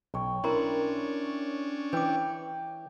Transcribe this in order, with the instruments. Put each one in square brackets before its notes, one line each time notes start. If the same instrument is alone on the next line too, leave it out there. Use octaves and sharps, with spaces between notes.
[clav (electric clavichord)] B1 [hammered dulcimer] C#5 G5
[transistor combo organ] C#4 D4 [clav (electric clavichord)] E4 [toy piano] A#4 A#5 C6
[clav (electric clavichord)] E3 [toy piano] B4 D6 [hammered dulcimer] G5